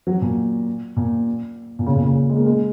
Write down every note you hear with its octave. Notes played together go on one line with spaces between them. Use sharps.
F#3
A#2
A#2
A#2
C#3
A#2
C#3
G#3
A#3
G#3